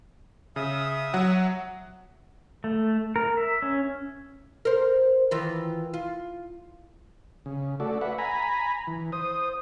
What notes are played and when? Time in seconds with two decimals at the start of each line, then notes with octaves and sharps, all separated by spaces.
0.56 C#3 E5 D#6
1.14 F#3 F#5
2.64 A3
3.16 A#4
3.37 E5
3.62 C#4
4.65 A#4 C5
5.31 D#3 E3 F4
5.94 F4
7.46 C#3
7.80 A3 F#4 A4 D5
8.01 B4 E5 F#5
8.18 G#5 A#5 B5
8.87 E3
9.12 C5 D#6